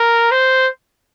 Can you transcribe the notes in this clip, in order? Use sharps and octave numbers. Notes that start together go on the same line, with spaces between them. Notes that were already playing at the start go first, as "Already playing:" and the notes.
Already playing: A#4
C5